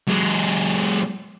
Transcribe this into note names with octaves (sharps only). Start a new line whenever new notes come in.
F#3 G#3